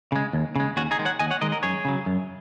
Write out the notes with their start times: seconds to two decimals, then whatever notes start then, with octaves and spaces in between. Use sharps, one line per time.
0.12 C#3 G#3
0.33 D#2
0.56 C#3 G#3
0.77 D#2 C#4 F#4
0.91 D#4 G#4
0.99 D#3 G#3
1.05 C#5 F#5
1.19 D#2 D#5 G#5
1.31 C#5 F#5
1.41 D#3 G#3 A#4 D#5
1.52 A#4 D#5
1.63 F#2 G#4 C#5
1.85 C#3 F#3
2.06 F#2